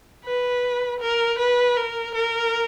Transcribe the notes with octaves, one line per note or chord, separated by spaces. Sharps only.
B4
A#4
B4
A#4
A#4